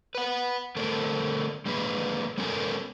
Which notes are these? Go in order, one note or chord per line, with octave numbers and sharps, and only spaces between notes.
B4 F#5
D3 A3 C4 D4 A4 A#4
G#3 A#3 D4 G#4 B4
G#3 B3 C#4 A4 A#4 G#5